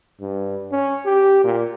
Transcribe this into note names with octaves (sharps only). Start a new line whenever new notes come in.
G2
C#4
G4
A#2